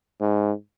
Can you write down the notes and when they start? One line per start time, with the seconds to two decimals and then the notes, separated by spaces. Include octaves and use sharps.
0.20 G#2